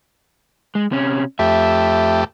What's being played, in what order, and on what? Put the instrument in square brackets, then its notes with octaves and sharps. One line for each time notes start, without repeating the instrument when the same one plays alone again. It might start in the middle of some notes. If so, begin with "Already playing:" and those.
[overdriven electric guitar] G#3
C3 C#4
[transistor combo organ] F2 A3 G4 [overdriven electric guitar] E5